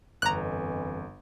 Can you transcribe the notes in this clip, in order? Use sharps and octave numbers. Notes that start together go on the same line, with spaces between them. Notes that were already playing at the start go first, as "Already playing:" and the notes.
G1 F2 E3 A#5 F#6